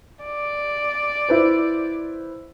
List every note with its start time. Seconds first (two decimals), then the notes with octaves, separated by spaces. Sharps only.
0.24 D5
1.29 E4 B4 C5